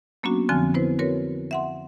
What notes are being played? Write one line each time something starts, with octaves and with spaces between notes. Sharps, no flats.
F#3 A#3 B3 C#4 D4 F#4
F2 D3 F3 C4 G#5 F6
B3 E4 B4 C5
C4 F#4 A#4 B4 C#5
E5 F#5 C6